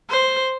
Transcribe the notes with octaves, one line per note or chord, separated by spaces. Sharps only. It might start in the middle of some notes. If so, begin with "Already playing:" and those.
C5